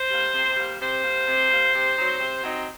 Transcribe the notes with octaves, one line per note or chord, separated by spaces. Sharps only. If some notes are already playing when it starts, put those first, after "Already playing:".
Already playing: C5
G3 A#3
C3
G3 A#3
C3 C5
G3 A#3
C3
G3 A#3
C3
F#3 C4 D#4
C3
F#3 C4 D#4